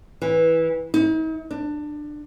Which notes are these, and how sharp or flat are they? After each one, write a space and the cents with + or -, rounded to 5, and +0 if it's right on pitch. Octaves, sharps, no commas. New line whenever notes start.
E3 -10
D#4 +45
D4 +20